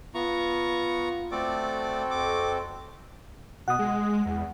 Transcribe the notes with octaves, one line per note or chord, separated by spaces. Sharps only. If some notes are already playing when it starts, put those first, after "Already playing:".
B3 F4 A#5 C#6
A3 C4 F#4 A4 D5 D6
F2 D6
B2 F#5 D#6
G#3
E2